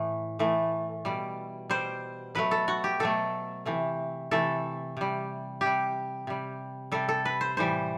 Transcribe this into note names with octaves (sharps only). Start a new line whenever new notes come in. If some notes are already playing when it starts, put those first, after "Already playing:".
Already playing: A2 E3 A3
A2 E3 A3
B2 G3
B2 G3 C5
B2 F#3 A3 B4
A4
F#4
G4
B2 F#3 A3 A4
C3 E3 A3
C3 E3 A3 A4
C3 G3
C3 G3 G4
C3 G3
C3 G3 A4
A4
B4
C5
A2 E3 G3 C5